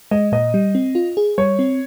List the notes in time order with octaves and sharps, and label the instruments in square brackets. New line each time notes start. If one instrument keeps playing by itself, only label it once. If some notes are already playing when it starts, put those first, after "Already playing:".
[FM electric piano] G#3 [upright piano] D#5
[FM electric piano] A#2 [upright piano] D#5
[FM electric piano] G3
C4
F4
G#4
[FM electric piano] G3 [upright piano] C#5
[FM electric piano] C4